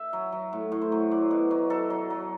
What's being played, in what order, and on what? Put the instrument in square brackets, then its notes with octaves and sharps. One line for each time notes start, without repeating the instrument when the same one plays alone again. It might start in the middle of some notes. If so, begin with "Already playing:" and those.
Already playing: [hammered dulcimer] E5
F#3
F#3
A2
A2
C5
F#3
F#3 D5
B2
F#3
F#3 A4
F#3
F#3